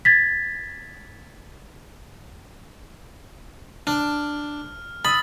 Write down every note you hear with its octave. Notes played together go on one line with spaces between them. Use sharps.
G#6 A6 B6
D4 F6
B5 D#6 E6 A6